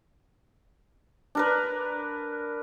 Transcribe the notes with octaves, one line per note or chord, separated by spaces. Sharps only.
D4 A#4 B4